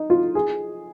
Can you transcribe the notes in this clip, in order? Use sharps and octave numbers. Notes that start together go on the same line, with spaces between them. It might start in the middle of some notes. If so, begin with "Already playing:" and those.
Already playing: D#4
F4
G#4